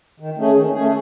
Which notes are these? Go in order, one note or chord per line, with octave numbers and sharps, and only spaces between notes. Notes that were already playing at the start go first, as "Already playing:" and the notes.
D#3
A3 C#4 G#4
D#3
A3 C#4 G#4